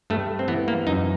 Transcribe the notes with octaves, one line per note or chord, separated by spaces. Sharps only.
G2 A3
C4
E3 B3
A#3
F#2 D#4